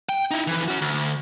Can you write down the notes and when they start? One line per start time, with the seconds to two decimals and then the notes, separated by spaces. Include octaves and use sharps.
0.09 G5
0.31 D#4 E4
0.47 F2 E3
0.68 C#4 F#4
0.81 D2